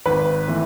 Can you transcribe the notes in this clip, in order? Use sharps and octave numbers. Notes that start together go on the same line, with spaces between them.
G#1 B4
E3 A3